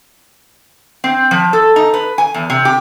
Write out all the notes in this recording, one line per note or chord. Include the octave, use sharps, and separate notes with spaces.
C4
F3
A4
D#4
B4
G#5
E2
C3
G4